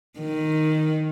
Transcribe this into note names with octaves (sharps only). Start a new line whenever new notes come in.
D#3